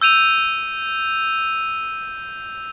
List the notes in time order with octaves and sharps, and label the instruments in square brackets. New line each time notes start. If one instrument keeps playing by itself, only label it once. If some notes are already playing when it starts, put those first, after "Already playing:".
[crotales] E6 G6 D#7 F7